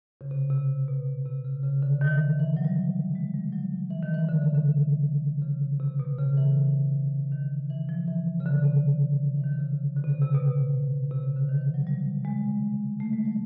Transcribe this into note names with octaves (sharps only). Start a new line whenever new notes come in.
C#3
C3
C3
B2
C3
C#3
C#3
D3
D#3
E3
D#3
E3
F#3
G3
G#3
G3
F#3
E3
D#3
E3
D3
C#3
D3
C#3
C3
B2
C#3
E3
D#3
E3
F3
E3
C#3
D3
C3
E3
D#3
D3
C#3
D3
C3
C#3
C3
B2
C3
C#3
D3
D#3
E3
F#3
G3
G#3
A3
G#3
F#3